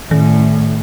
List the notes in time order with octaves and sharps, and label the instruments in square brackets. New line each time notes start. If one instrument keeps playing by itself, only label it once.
[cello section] A2 [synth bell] D#3